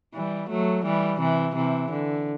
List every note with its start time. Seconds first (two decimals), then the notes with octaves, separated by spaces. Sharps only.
0.14 E3 G3
0.49 F#3 A3
0.84 E3 G3
1.20 C3 E3
1.55 C3 E3
1.91 D3